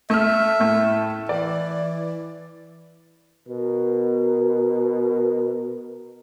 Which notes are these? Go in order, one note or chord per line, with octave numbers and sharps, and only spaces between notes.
A3 E5 F6
A2 A3
E3 D5
B2 A#4